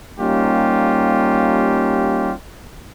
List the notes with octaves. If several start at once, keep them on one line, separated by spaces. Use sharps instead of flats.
G3 A#3 C#4 D#4 F4 G4